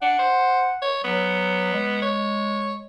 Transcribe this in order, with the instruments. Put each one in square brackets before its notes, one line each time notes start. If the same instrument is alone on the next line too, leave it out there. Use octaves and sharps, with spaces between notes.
[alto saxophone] D4 [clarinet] F#5
[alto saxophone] C5
C#5
[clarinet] F#3 [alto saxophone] B3
[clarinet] G#3
[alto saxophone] C#5